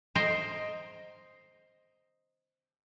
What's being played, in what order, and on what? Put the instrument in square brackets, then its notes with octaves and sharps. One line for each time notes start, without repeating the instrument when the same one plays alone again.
[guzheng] C5 D#5 G5 A#5 C6